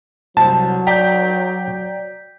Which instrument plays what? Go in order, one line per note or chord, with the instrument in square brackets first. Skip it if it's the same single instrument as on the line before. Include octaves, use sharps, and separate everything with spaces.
[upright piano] C2 C5 [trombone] F#3 [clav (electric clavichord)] A5
[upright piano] D5 G5 A#5 [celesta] G6 B6